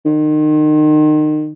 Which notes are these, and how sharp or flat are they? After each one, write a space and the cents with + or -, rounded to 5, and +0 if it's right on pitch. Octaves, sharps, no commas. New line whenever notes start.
D#3 -30